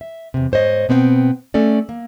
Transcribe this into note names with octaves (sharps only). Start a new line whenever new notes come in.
E5
E2 C3
G#2 C5 C#5 D#5
B2 B3 C4 D5 G5
A3 C#4 A4 D5
A#3